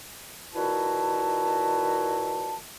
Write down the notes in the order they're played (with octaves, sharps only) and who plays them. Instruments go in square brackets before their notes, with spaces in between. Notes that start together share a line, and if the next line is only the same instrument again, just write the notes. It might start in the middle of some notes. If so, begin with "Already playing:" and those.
[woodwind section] A#2 D#3 E4 F#4 B4 A5